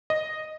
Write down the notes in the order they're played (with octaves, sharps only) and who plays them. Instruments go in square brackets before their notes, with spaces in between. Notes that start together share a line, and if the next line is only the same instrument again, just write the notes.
[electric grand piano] D#5